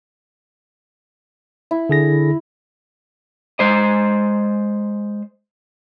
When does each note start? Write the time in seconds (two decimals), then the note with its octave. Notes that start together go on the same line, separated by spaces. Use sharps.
1.71 E4
1.89 D3 G#4 A#6
3.59 G#3 C5 D#5